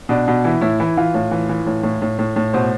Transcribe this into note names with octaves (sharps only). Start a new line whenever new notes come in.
B2 D4
B2
E3 E4
A2 E4
E3 E4
E3 F4
A2
E3
E3
A2
A2
A2
A2
A2
B2 C5